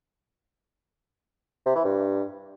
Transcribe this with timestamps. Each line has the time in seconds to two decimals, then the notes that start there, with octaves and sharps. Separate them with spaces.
1.66 C3
1.75 E3
1.84 G2